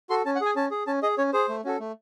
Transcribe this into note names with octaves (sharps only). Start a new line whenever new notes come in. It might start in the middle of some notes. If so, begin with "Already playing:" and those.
F#4 A4 C6
C#4 A5
F#5
G#4 G#5
C#4 A5
G#4
C#4 A5
G#4 D#5
C#4 C#5
G#4 C5
A3
C#4 F#4 A4
A3